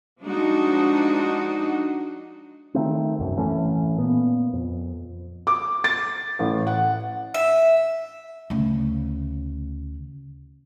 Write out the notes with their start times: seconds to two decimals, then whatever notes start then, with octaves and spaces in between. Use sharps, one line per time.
0.21 F3 G#3 D4 D#4 F#4
2.74 D#3 A3 C4
3.19 C2 F#2
3.37 A1 E3 A3 C#4
3.99 A#2 B3
4.53 F2
5.47 D6
5.84 A6
6.39 A1
6.67 F#5
7.34 E5
8.50 D2 C#3